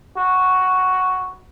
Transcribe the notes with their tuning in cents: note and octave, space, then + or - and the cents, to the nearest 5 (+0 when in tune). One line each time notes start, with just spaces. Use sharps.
F#4 +0